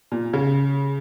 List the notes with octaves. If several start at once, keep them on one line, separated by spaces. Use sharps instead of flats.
A#2
C#3